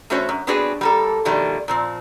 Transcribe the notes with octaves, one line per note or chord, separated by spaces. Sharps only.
E2 A3 C#4 F#4 C5 C#5
F#2
B3 C4 D4 F#4 G#4 B4
G3 A#3 A4
B2 D#3 F3 G3 A3
A#2 F3 C4